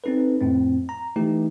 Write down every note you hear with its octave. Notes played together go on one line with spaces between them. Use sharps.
C4 C#4 D#4 A4 B4
F2 A2 C4
A#5
E3 A3 D#4 G4